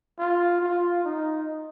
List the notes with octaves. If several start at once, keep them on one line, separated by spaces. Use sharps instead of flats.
F4
F4
D#4